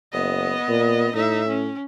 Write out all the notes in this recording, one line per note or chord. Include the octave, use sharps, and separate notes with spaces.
F#1 B3 D#5
A#2
A2 D#4 E5
C#4